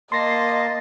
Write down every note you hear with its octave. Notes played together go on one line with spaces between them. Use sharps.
A#3 D#5 A5 C6 A#6 C7